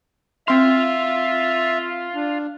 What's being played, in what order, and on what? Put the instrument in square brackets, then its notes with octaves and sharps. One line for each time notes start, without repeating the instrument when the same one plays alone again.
[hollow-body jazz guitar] C4 C6 [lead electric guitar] F4 F5 [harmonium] E5
[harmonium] D4